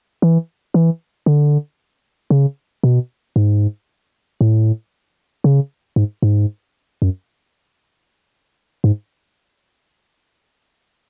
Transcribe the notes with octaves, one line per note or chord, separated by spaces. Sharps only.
E3
E3
D3
C#3
B2
G#2
A2
C#3
G#2
G#2
F#2
G#2